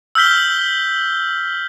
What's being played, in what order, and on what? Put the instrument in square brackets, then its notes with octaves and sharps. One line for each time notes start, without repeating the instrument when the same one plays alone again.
[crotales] E6 F6 G6 B6 G7